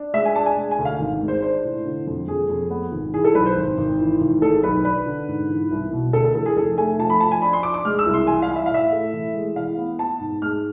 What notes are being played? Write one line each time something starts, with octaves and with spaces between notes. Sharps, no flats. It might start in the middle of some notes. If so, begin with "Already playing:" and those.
Already playing: D4
G#3 E5
G#5
D4 A5
G#5
G#3
G#5
D2
F5
G#1
G#3
C5
D4 C5
A2
D3
F2
F2 G#4
F2
B3
G#1
E3 G#4
A4
B1 B4
C5
G#1
G#1
E3
G#1
G#3 A4
B1 B4
D4 B4
D3
G#2
E3
C2
B2
D2 A4
A4
E3 A4
G#4
F1 A4
A3 G#5
F3 A5
B5
F3 A5
G#5
D4 B5
C6
D4 D6
D6
G#3 F6
E6
C2
C6
E3 G#5
F5
E4
E5
F5
A2 E5
A3
E3
G#3
E3 F5
B3
B3 A5
G#2
G#3 F6